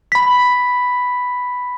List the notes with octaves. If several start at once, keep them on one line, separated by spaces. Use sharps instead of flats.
B5 B6